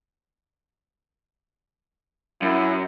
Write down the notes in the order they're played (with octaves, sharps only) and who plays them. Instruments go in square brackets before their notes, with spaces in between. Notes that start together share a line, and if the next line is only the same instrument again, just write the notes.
[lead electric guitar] F#2 [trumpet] E4